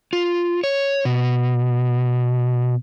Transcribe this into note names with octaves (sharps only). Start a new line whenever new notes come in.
F4
C#5
B2